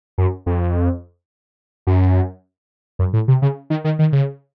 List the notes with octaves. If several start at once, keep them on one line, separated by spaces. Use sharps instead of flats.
F#2
F2
F#2
F#2
A2
C3
C#3
D#3
D#3
D#3
C#3